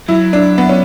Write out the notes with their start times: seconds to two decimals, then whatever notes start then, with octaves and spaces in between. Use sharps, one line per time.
0.08 F#3 E4
0.33 D4
0.58 B3
0.69 C#4